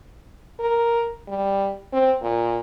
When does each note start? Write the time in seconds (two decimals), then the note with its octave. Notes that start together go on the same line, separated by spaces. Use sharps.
0.60 A#4
1.28 G3
1.93 C4
2.22 A#2